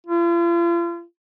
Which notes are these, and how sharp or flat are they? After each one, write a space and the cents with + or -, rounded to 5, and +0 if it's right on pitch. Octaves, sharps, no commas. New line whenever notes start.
F4 -40